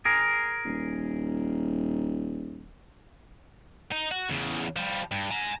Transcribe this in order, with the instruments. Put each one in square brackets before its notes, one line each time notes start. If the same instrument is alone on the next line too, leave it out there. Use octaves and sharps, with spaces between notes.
[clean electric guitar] G#4 A#4
[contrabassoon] D#1
[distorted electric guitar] D#4
F#4
E2 C#3
F3 G3
G2
G#5 A#5